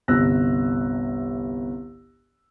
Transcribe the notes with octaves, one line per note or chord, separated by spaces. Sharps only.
G1 C2 E6 F#6 A#6